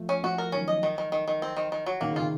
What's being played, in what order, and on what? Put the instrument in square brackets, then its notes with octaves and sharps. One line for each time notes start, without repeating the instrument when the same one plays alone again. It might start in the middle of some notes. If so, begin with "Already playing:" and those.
Already playing: [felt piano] F3 A3
[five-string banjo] C#4
[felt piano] F3 A3 [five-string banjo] F#4
[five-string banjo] A#4
[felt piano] D#3 F#3 [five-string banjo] C#4
[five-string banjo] D#5
D#3
D#3
D#3
D#3
C4
D#3
D#3
F#3
[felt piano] D#3 [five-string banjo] A#3
[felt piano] C#3
[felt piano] C3 D#3 [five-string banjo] F4